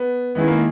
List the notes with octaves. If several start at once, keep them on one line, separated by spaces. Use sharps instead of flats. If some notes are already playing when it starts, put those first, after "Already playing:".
Already playing: B3
D#3 G#3 B3 C#4 E4 G#4
A#3